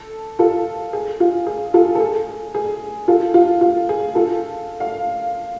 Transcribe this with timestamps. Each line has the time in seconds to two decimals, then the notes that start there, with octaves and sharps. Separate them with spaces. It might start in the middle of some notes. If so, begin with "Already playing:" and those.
Already playing: A4
0.39 F4 A4
0.93 G#4
1.20 F4
1.47 G#4
1.74 F4 A4
1.95 A4
2.00 G#4
2.55 G#4
3.08 F4 A4
3.34 F4
3.61 F4
3.89 G#4
4.15 F4 A4
4.80 F5